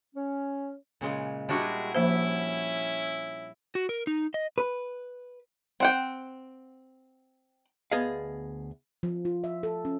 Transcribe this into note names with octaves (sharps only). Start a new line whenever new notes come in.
C#4
A#2 C#3 G#3
G3 G#3 D4 E4 F#4 G#4
F3 A#3 C#4 E4 C5
F#4
A#4
D#4
D#5
B4
C4 F#5 G5
D2 B3 G#4 D#5 F5
F3
F4
E5
A4
C#4